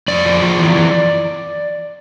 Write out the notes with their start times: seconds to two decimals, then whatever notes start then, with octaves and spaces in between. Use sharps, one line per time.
0.08 F2 D5
0.25 F3
0.42 F3
0.59 E3
0.75 E3